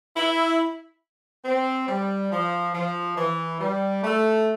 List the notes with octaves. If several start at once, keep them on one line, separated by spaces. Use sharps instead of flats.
E4
C4
G3
F3
F3
E3
G3
A3